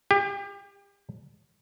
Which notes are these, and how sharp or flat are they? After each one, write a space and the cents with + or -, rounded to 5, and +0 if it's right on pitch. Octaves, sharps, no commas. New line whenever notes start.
G4 +35